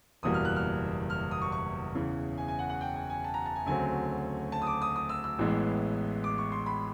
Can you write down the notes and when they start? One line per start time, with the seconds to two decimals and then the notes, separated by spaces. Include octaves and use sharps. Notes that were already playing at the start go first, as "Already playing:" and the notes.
0.23 F#1 E2 B2 G3 A#3 D#6
0.34 F6
0.45 F#6
0.56 F6
1.10 F6
1.31 D#6
1.42 C#6
1.52 C#6
1.95 E2 C#3 E3
2.37 G#5
2.48 G#5
2.59 F#5
2.70 F#5
2.81 G5
2.96 G#5
3.10 G#5
3.24 A5
3.34 A#5
3.46 A5
3.55 G#5
3.66 D2 C#3 F#3 A3 C4 G#5
4.52 A5
4.62 D#6
4.67 D6
4.82 D#6
4.96 D#6
5.09 E6
5.24 E6
5.39 A1 A2 E3 G#3 B3
6.24 D6
6.38 C#6
6.52 C6
6.66 B5